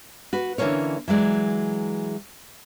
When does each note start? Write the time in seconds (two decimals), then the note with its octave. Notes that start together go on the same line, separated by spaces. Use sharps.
0.33 F#4 B4
0.58 D3 E3 F#3 A#3 C#4 C#5
1.08 E3 F#3 G#3 D5